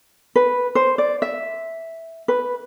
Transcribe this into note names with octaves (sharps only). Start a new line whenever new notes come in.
B4
C5
D5
E5
B4